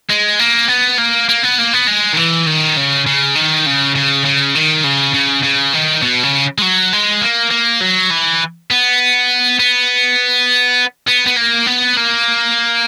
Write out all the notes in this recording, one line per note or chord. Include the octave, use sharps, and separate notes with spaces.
G#3
A#3
B3
A#3
A#3
B3
A#3
B3
G#3
D#3
E3
D#3
C#3
C#3
D#3
C#3
C#3
C#3
D#3
C#3
C#3
C#3
D#3
B2
C#3
G#3
F#3
G#3
A#3
A#3
F#3
E3
B3
B3
B3
B3
A#3
B3
A#3